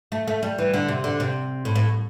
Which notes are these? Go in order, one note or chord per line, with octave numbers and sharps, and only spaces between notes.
A3
A3
G3
E3
D3
C3
D3
C3
A2
A2